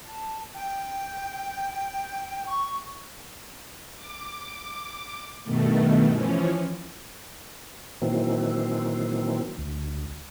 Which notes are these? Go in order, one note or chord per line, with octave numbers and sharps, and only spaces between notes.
A5
G5
C#6
D6
G2 B2 D#3 A3
E3 F3 C#4
A#2 D#3 E3 F#3 C4
D2